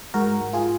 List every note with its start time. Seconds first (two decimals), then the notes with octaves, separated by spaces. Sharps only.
0.14 G#2 F#4 A#4
0.41 G#2
0.53 F4 G#4